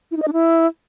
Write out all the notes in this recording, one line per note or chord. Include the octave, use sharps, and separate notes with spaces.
E4
D#4
D#5
D4
E4